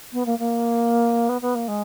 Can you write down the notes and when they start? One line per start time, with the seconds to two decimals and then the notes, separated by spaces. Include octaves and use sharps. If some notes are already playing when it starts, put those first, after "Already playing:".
0.13 B3
0.26 A#3
0.39 A#3
1.29 B3
1.41 B3
1.55 A#3
1.68 G#3